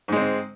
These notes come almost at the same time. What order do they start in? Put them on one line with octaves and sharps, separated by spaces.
G#2 G#3 C4